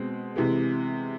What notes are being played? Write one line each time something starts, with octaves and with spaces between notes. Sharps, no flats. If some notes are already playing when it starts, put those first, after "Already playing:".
Already playing: B2 G#3 C4
C3 E3 G#3